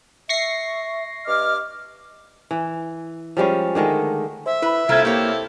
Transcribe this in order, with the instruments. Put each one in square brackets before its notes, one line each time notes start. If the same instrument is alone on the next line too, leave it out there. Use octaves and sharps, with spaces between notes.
[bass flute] E5 [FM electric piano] C#6 A#6 C7
[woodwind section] G2 D6 F6 [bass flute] D#5
[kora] E3
F3 G3 G#3 C#4
D3 D#3 G#3 A3
[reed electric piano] C5 [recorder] E5
[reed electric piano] E4 B5 [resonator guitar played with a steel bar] B4
[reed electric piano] C2 G#6 [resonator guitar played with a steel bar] A3 A#3 F4 [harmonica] C4 E4 A4
[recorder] A#3 [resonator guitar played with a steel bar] G4 C#5